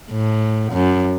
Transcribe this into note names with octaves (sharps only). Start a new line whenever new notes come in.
A2
F#2